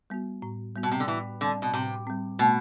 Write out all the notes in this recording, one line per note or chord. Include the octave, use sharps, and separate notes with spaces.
G3 B3 F#4
A2
G3 B3 F#4
B2
C3
D3
A2 E3
D3 G3 C4
B2
A2 C3
G3 C4
B2 A3